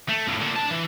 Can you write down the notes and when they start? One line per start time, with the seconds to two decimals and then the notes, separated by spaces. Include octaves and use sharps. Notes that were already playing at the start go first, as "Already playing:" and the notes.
0.09 A3
0.27 F2 A2
0.40 A#2 D3
0.56 D4 A5
0.70 E3